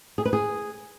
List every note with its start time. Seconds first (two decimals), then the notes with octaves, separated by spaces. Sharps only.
0.18 G#4
0.25 B4
0.33 G#4